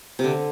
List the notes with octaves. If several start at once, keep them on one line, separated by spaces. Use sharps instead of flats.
C3
D3